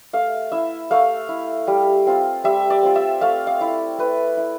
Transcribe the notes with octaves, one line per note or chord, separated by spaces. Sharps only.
A3 F5
E4 E5
A3 F5
E4
G3
C4 F4
G3 E5
D5
C4 F4
E5
A3 F5
F5
E4
A3 B4
E4